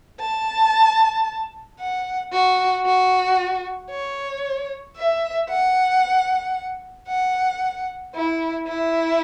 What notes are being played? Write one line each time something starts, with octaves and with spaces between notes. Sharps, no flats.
A5
F#5
F#4
F#4
C#5
E5
F#5
F#5
E4
E4